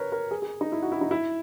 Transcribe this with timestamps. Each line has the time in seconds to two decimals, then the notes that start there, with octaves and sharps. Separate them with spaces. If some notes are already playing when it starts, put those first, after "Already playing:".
Already playing: A#4 B4 C#5
0.12 A#4
0.31 G#4
0.42 G#4
0.61 D#4
0.72 E4
0.82 F#4
0.92 E4
1.01 D#4
1.11 E4